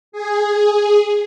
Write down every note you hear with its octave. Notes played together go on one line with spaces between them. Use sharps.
G#4